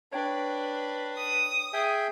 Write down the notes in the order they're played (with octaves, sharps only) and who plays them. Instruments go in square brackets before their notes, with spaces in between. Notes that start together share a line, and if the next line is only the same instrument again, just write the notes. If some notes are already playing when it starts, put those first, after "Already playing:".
[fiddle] D4 B4 [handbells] C#5 G5
[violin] D#6
[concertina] G#4 E5 G5